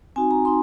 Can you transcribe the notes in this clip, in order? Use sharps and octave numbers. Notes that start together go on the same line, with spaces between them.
C4 D#4 F#4 G#5
A#5
C4 D#4 C6